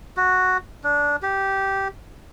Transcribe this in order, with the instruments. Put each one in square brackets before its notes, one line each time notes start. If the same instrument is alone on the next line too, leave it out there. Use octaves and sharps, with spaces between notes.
[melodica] F#4
D4
G4